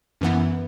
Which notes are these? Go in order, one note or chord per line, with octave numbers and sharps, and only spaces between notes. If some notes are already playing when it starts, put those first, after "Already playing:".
F#2 E3 B3 E4